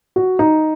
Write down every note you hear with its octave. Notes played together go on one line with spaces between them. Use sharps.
F#4
D#4